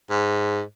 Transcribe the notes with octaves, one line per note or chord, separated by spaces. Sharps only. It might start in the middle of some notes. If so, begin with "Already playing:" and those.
G#2